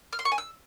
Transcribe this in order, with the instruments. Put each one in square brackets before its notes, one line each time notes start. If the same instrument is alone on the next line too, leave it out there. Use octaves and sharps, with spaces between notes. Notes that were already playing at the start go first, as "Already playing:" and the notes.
[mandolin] F6
C6
C#6
G#5
E6